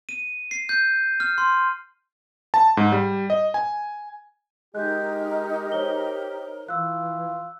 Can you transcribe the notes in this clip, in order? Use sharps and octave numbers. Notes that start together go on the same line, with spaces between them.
D#7
C7
G6
F6
C6
A5
G#2
G3
D#5
G#5
G#3 D#4 G4 A#4 F#6 G6
C5 C#5 G7
E3 F4 E6 F#6